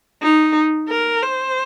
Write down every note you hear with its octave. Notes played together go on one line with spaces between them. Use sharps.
D#4
A#4
C5